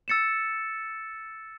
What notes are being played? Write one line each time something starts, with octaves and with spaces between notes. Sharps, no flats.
E6 A6 C#7 E7